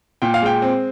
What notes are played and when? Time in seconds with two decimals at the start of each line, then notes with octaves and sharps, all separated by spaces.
0.22 A#2 G5
0.34 F5
0.42 G#3 G5
0.62 C4